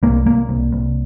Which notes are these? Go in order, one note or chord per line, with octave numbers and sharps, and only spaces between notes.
C2 A#3
C2 A#3
C2
C2